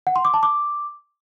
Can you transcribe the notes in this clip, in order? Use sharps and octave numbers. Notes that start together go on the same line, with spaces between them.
F#5
C6
D6
A5
D6